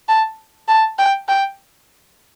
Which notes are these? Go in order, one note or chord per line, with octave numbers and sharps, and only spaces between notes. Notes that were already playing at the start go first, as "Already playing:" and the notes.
A5
A5
G5
G5